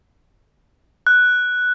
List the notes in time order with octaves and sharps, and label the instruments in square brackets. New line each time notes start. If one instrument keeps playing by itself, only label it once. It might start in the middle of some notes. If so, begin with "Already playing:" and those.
[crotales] F#6